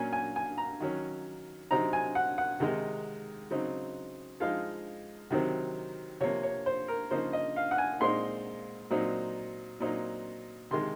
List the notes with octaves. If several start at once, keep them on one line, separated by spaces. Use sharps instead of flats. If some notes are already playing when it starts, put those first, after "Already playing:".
Already playing: A#2 F#3 A#3 C#4 G#5
G#5
G#5
A#5
D#3 F#3 C#4
C3 F#3 C4 D#4 A#5
G#5
F#5
F#5
C3 D#3 G#3 D#4
C#3 F#3 C4 D#4
F3 G#3 D#4 F5
C3 D#3 F#3 C4
C3 F3 A#3 C#5
C#5
C5
A#4
C#3 F3 A#3 D#4 C5
D#5
F5
F#5
G#5
A#2 G#3 C4 D#4 C6
A#2 F#3 C4 D#4
A#2 F#3 C4 D#4
C3 D#3 G#3 C6